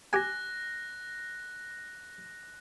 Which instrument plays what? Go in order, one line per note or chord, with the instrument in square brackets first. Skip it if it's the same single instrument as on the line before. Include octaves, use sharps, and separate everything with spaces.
[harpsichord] G4 G#5 [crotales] F#6 A#6